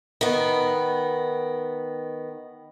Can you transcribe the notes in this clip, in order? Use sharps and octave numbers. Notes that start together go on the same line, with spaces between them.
D#3 B3